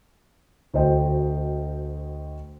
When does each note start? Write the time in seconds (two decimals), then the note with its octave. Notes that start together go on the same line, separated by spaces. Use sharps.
0.74 D2 F#4 C5 D#5 G5